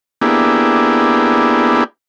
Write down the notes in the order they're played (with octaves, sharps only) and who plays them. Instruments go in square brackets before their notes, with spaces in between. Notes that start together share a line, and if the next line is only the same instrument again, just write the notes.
[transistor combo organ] A#3 B3 D4 E4 G4 G#4